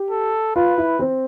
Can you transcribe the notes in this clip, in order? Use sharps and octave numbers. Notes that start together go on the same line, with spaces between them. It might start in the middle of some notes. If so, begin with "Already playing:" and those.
Already playing: G4
A4
F4 B4
E4
C4